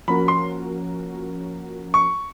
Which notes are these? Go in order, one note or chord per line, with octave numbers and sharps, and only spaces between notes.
F3 A#3 C#4 F#4 A#4 B5
C6
C#6